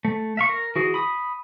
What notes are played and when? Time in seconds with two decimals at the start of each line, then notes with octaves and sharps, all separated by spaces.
0.05 A3
0.37 E5 F5 C#6
0.49 A#4
0.76 E3 F#4 G#4
0.94 B5 D#6